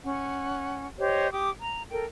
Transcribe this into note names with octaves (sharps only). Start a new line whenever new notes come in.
C#4 F#5
G4 C5 C#5 D#5
G4 G5 D6 D#6
A#5
A4 A#4 G5